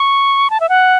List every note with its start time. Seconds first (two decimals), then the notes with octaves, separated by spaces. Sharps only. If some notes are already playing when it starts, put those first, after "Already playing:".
Already playing: C#6
0.50 A5
0.60 E5
0.69 F#5